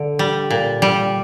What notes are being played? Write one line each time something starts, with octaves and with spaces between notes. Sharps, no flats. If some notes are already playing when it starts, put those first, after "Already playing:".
Already playing: D3
G3
A#2
G3